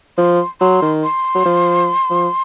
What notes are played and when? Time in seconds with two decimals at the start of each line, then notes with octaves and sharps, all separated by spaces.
0.18 F3 C6
0.61 F#3 C6
0.82 D#3
1.03 C6
1.35 F#3
1.45 F3
2.10 F3